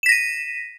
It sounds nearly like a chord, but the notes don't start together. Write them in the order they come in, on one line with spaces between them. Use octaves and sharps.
E7 B6 A#6 D#7